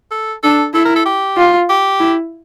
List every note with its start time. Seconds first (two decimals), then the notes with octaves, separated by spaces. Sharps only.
0.12 A4
0.43 D4 A4
0.74 E4 A4
0.85 A#4
0.96 A4
1.05 G4
1.38 F4
1.69 G4
2.00 E4